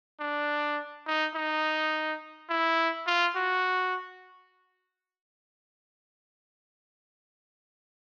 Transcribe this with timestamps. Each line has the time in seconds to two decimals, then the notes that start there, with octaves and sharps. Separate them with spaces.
0.20 D4
1.07 D#4
1.35 D#4
2.49 E4
3.07 F4
3.36 F#4